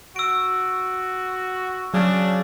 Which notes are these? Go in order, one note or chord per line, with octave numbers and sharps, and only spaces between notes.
F#4 E6 D7
C#3 F#3 D4